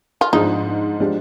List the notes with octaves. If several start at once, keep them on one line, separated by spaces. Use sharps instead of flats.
F4
G#2 F3 G#3 D4 D#4
F3 G#3 D4 G4